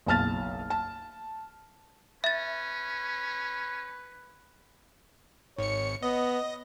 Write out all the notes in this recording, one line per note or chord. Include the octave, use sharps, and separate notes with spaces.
F#1 B1 A5 F6 A6
A5
C#4 B4 E5 A6
G#1 C#5 C#7
B3 D#5